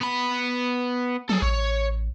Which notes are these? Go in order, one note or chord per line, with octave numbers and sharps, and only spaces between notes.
B3 B5
F#3 G#4 A4
A1 C#5